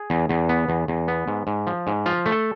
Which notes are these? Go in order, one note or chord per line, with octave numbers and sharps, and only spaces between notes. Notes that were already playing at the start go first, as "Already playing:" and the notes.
Already playing: G#4
E2
E2
B3
E2
E2
B3
G#2
G#2
F3
G#2
F3 F4
A3
A4